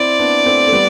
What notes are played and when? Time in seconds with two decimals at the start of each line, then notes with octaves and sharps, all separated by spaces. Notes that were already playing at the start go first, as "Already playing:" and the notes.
Already playing: C4 E4 D5
0.19 B3 D4
0.46 A3 C4
0.67 A3
0.73 G3 B3